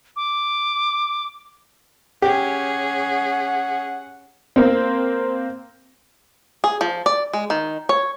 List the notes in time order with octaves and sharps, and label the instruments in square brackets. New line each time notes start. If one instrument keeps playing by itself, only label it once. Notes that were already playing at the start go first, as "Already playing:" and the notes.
[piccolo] D6
[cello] C#4 G#4 [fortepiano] G4 [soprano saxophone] F#5
[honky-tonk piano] A#3 C4
[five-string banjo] G#4
F3
D5
G#3
D#3
C#5